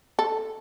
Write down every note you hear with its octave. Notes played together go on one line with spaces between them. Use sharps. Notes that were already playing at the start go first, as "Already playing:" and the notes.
A4